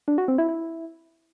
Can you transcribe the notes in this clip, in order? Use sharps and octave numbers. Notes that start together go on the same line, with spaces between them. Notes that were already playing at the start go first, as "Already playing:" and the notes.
D4
F#4
C4
E4
E4